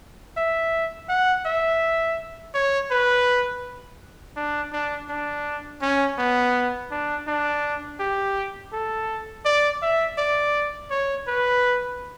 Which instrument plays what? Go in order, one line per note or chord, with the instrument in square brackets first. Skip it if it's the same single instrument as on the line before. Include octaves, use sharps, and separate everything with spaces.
[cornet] E5
F#5
E5
C#5
B4
D4
D4
D4
C#4
B3
D4
D4
G4
A4
D5
E5
D5
C#5
B4